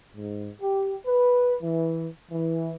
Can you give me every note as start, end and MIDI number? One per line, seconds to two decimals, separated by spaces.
0.14 0.47 44
0.62 0.93 67
1.06 1.54 71
1.62 2.06 52
2.31 2.73 52